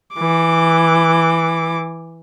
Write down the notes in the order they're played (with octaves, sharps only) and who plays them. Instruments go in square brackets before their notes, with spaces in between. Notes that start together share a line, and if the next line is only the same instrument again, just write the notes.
[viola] E3 D6